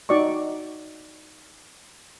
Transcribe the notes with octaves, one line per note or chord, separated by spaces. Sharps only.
D#4 F#4 D5 D#5 C#6